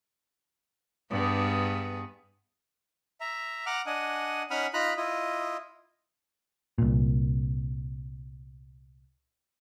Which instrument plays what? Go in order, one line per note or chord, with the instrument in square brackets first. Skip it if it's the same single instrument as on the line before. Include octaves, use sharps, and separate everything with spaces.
[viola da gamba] G2 B3 G#4
[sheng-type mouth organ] E5 A#5
F#5 A#5 D6 F6
D4 D#5 F#5 G#5
C#4 D#4 F#5 B5 D#6 F6
D#4 F4 A#5 B5 F#6
E4 F4 D#5
[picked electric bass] C2 A#2